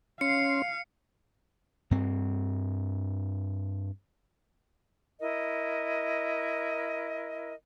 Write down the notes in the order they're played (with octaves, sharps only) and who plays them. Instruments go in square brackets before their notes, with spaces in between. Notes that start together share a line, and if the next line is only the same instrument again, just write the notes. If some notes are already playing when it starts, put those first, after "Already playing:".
[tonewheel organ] C#4 C6 [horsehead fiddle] F5 [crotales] C#7
[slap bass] G2 C4
[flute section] E4 A#4 D#5